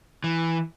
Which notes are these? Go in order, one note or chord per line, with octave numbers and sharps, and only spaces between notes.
E3